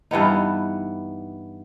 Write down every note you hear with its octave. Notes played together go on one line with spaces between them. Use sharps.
G2 E3 B3 D#4